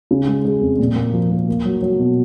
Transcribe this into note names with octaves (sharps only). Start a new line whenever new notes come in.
C#3
G#3
G#3
F2
A#2
A#3
F3
A#3
A#3
F#3
F#3
B2